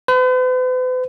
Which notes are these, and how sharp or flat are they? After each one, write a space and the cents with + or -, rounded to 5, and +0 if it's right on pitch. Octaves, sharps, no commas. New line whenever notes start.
B4 +45